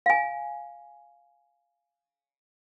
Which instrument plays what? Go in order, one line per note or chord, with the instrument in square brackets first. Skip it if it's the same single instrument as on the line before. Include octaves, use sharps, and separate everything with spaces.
[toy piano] F5 G#5